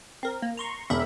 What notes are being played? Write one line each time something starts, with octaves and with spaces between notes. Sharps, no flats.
C4 A#4
A#3
A#5 C6 C#6
E1 A#4 E5 B5